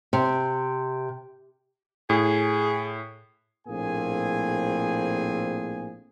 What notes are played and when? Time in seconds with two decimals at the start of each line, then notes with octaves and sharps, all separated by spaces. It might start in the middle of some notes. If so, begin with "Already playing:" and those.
0.13 C3
2.10 A2 G#4
3.67 A#1 A2 A#3 C4 G#4 G#5